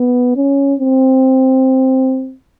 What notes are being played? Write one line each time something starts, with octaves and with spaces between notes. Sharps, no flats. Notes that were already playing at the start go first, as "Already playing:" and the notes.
Already playing: B3
C#4
C4